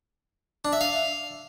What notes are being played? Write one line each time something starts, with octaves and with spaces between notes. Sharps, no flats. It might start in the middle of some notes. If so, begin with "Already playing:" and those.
D4
E5
F5